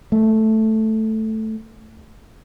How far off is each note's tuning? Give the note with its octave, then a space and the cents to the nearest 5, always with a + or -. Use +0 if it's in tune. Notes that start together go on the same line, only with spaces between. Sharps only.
A3 +0